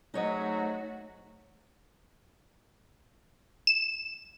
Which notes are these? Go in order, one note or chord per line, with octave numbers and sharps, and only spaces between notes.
G#2 F#3 A3 D#4 F#4 C#5 D#5
E7